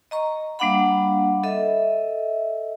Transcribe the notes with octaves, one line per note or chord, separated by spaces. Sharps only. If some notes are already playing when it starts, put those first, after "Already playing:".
D#5 A#5 C#6
G3 A#3 D4 F5 F#5 B5
A4 D#5 E5